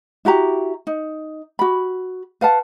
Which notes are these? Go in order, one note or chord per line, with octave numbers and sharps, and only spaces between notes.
E4 F#4 G4 A#5
D#4
F#4 B5
B4 F5 F#5 A5